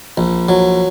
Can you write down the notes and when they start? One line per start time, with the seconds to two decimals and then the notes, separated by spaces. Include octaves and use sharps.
0.17 A#1
0.49 F#3